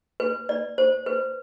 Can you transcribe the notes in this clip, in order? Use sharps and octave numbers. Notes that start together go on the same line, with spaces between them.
B4
D5
C5
B4